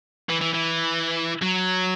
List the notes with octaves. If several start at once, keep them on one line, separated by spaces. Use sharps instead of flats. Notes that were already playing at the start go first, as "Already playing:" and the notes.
E3
E3
E3
F#3